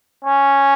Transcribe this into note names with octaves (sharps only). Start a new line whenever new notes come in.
C#4